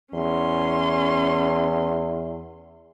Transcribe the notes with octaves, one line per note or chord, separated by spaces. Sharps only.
E2 C#4 C6